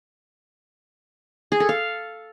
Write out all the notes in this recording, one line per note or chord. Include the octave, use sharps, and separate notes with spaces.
G#4
A4
F5